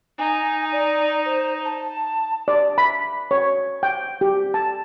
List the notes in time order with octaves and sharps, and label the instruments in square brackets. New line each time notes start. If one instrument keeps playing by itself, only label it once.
[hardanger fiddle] D#4 [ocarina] G#5
[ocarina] D5
C5
A5
[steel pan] D5
B5
C#5
G5
G4
A5